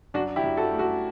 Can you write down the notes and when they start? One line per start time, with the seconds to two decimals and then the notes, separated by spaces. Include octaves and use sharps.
0.14 F#2 D4 F#4
0.36 E4 G4
0.44 F#2
0.57 F#4 A4
0.71 A3
0.79 F#4 A4